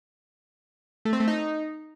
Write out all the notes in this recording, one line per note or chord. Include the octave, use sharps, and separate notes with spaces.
A3
C4
A3
D#4